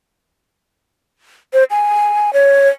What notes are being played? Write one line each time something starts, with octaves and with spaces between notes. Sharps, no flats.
C5
G#5
C#5